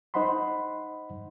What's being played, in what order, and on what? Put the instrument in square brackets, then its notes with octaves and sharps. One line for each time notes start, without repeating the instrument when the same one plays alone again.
[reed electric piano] D#4 C5 D#5 F#5 B5 C6